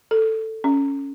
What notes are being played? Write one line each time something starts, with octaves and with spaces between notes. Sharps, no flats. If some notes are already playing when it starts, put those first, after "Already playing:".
A4
C#4